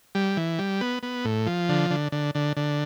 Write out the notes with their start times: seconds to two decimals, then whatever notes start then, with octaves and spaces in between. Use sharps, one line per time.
0.15 G3
0.37 E3
0.59 G3
0.81 B3
1.03 B3
1.25 A2
1.46 F3
1.69 D3
1.90 D3
2.12 D3
2.35 D3
2.57 D3